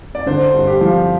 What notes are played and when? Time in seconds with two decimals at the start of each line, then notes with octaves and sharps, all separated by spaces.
0.15 D5
0.26 D3 C5
0.54 G2
0.67 G4
0.81 F3